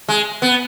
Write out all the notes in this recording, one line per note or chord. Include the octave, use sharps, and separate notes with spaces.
G#3
B3